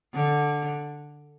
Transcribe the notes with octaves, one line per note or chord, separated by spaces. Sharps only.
D3